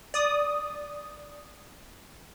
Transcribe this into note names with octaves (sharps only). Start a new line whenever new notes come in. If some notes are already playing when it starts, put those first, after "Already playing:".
D5 D#6